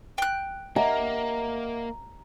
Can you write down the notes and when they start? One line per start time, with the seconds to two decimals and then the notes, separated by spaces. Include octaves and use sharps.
0.18 G5 F#6
0.76 A#3 D#5 E5 F#5 A#5